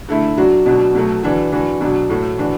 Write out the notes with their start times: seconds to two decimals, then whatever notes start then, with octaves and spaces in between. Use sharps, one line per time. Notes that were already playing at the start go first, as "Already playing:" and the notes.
0.09 D3 A3 E4
0.37 F#3 D4 F#4
0.66 B2 F#3 D4 F#4
0.95 B2 F#3 A3 F#4
1.23 E3 D4 F#4
1.52 E3 D4 F#4
1.81 B2 F#3 D4
2.09 A2 A3 F#4
2.38 E3 D4 F#4